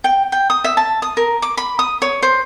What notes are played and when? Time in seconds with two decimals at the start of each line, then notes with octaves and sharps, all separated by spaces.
0.04 G5
0.32 G5
0.50 D#6
0.64 E5
0.77 A5
1.02 D#6
1.17 A#4
1.42 D6
1.57 B5
1.79 D#6
2.02 C#5
2.22 C5